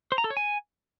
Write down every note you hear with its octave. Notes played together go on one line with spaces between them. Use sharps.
C5
A#5
A4
C#5
G#5